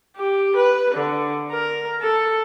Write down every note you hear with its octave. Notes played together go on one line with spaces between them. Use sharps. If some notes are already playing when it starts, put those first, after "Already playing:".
G4
B4
D3
A#4
A4